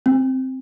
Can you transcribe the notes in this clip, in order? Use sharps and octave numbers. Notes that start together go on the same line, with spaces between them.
C4